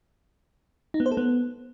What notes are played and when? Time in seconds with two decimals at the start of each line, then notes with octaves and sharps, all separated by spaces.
0.94 D#4
1.00 B3
1.06 C5
1.12 A4
1.17 B3